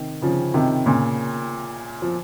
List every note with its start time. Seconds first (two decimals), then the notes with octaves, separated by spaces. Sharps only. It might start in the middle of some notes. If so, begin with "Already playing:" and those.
Already playing: C3 D#3
0.22 C#3 F3
0.54 C3 D#3
0.86 A#2 C#3
2.02 F3